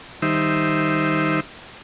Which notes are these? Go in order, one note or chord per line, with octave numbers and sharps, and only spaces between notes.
D#3 G3 D#4 C5 E5